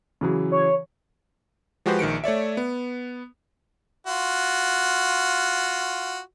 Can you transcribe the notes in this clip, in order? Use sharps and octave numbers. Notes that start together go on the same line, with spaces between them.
C#3 E3 F#3
C#5
F3 G#3 F#4 G4 B4 C5
A#1 D#3 C#7 D7
A3 C#5 D5 E5
B3
F4 F#4